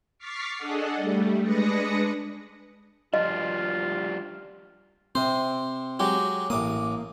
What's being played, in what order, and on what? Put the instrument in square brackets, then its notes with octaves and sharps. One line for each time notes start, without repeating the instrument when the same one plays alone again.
[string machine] C#6 D6 F6 A6 B6 C7
D4 G#4 A4 D#5 F#5
G3 A3
G#3 D4 B4 D#6 A#6 C#7
[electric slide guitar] F3 G3 D4 [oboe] F4 [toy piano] D#5
[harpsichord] C3 C5 [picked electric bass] C4
[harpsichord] F#3 G#3 G4
[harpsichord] A1 D6 D#6 [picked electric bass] A#3